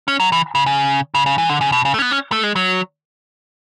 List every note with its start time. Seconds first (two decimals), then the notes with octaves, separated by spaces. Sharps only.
0.08 C#4
0.20 F#3
0.32 E3
0.55 C#3
0.66 C#3
1.15 C#3
1.26 C#3
1.38 E3
1.49 D3
1.61 C#3
1.72 B2
1.85 C#3
1.94 A3
1.99 C#4
2.02 B3
2.11 C#4
2.32 A3
2.43 G#3
2.56 F#3